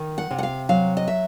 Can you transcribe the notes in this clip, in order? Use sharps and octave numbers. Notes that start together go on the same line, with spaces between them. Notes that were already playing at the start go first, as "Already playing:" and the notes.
Already playing: D#3
F#5
C3
F#5
F5
F#3 F5
D#5
E5